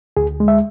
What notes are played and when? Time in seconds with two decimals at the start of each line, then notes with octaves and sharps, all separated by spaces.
0.17 D2 G#4
0.40 G#3
0.48 E5